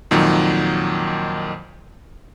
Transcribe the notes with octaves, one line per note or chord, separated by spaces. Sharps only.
F2 A#2 D#3 F#3